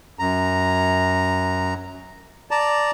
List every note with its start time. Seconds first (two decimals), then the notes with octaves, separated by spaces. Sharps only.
0.19 F#2 A#5
2.51 D5 A5 A#5